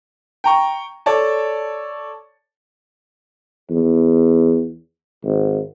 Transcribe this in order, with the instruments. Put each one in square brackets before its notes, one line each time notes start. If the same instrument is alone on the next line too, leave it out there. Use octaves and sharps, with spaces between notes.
[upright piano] G5 A#5 C#6
A4 C#5 D5 A5
[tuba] E2
G#1